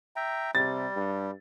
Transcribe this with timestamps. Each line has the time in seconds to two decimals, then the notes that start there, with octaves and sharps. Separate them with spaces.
0.16 E5 G5 A#5
0.55 C3 G3 A6
0.96 G2